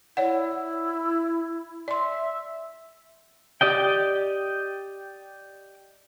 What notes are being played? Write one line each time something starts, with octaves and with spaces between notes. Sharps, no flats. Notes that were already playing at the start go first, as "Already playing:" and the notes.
E4 C#5 D5 F#5
D5 E5 C6
G4 D5 D#5 G5